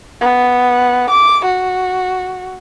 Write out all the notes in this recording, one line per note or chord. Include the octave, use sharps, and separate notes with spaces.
B3
D6
F#4